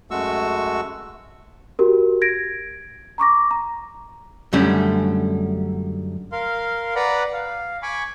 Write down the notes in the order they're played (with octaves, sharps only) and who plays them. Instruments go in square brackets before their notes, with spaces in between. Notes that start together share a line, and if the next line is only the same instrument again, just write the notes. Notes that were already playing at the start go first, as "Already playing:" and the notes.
[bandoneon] F#2 G#3 A3 F#4 C#6 E6
[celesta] F#4 G4 A#4
G#6 A#6 D7
A#5 C#6 D6 A#6
A#5
[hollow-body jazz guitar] F#2 D3 G3 A3 C#4
[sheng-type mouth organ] A#4 F5 C6
B4 D5 F#5 A#5 B5
F5
G#5 B5 C#6 D6